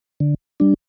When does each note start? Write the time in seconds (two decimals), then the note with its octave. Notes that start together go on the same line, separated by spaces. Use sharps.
0.20 D3
0.60 G3 D4